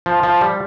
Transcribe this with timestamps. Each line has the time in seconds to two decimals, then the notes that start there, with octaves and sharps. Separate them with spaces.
0.06 F3
0.23 F3
0.41 G3